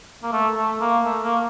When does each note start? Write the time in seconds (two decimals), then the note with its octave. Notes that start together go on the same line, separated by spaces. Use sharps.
0.23 A#3
0.32 A3
0.56 A3
0.81 A#3
1.05 A3
1.23 A#3